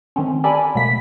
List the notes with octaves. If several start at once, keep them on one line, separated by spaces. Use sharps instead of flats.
D#3 A3 C4 C#4
G4 A4 A#4 D5 G#5 B5
B2 F#3 A3 A#3 B6